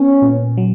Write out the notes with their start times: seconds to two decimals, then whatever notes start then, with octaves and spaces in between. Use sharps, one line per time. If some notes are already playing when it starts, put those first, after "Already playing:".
Already playing: B3 C#4
0.22 A#2
0.58 F#3